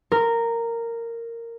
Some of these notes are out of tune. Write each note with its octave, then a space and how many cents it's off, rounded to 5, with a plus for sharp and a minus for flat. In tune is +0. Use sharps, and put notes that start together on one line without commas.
A#4 -10